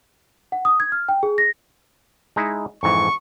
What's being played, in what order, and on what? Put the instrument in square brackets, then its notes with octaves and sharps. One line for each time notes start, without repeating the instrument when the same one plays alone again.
[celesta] F#5
D#6
G#6
F6
G5
G#4
A#6
[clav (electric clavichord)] G#3 D#4 E4
[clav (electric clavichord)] F2 G#2 E3 [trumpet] C#6